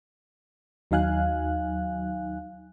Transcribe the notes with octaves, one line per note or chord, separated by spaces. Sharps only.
D#2 F#3 D#4 F5 G#5 F#6